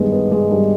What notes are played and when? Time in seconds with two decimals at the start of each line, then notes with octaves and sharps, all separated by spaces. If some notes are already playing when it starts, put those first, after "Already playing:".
Already playing: G2 D#3 G#3 B3
0.12 B3
0.32 G#3
0.51 G2